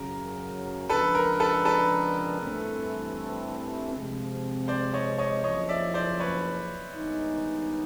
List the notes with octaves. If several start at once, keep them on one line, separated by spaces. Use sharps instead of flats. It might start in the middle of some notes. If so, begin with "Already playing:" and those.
Already playing: F#2 C#3 F#3 A#4
C#3 F3 G#3 B3 D4 A4 B4
A#4
A4 B4
A4 B4
G2 E3 A3 C4
C3 F3 G#3 C4
C5 D5
C#5 D#5
C#5 D#5
F#1 F2 C#3 F3 C#5 D#5
D5 E5
C5 D5
B4 C#5
G2 D#3 G#3 B3 D#4